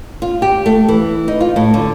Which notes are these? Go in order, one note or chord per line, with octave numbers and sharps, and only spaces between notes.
F4
G4
A3
E3
D#4
F4
A2
D3